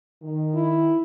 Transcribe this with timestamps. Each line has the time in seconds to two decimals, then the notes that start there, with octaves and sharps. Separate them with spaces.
0.22 D#3
0.55 E4